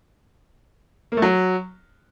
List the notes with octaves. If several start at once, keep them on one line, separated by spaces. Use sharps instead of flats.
A#3
A3
F#3